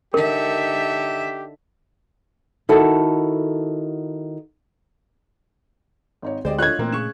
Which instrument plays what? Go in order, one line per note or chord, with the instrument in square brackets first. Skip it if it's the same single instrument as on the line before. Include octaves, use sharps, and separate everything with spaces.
[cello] D3 E5 [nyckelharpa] D#4 A4 [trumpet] G4 [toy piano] A#4
[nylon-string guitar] D#3 E4 F#4 A4
[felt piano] G#1 D#4 C#5
[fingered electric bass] D2 D3 [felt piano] G#3 G4 [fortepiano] C5 D5 D#5
[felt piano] F3 A3 D4 [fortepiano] F4 C#5 D#5 [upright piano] F#6 G#6
[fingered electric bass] A#2 A3 [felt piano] E3 A#3 C4
[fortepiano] C#3 G#4 C#6 [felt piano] E7